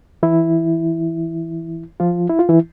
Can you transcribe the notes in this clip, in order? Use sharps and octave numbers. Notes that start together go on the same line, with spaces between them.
E3 E4
F3 F4
E4
F4
E3 E4